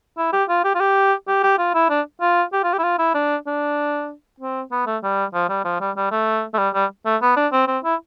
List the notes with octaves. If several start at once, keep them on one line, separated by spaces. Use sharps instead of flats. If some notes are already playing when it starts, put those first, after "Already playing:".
E4
G4
F4
G4
F4
G4
G4
G4
F4
E4
D4
F4
G4
F4
G4
E4
F4
E4
D4
D4
C4
B3
A3
G3
F3
G3
F3
G3
G3
A3
A3
G3
G3
A3
B3
D4
C4
C4
E4